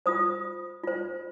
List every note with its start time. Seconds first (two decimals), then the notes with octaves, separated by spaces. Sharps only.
0.06 F4 C5 D#6
0.84 F4 C5